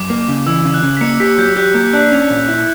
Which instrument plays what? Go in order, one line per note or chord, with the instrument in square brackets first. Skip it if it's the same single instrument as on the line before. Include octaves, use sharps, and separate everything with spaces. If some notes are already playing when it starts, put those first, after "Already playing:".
Already playing: [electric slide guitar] F#2 [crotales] D6
[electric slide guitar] A#3
C#3
[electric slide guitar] E3 [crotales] E6
[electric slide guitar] C#3
[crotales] F#6
[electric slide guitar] C#3
[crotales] B6
[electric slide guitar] A#3 [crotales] C#7
[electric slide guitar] G4 [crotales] B6
[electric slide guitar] F#3 [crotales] G6
[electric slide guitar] G4 [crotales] F#6
[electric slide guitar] A#3 [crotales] G6
[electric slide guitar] D4 [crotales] F#6
[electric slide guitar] C#4
A#2
E4